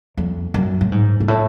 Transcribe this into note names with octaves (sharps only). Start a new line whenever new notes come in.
F2
F#2
A2
G#2
G#2
A2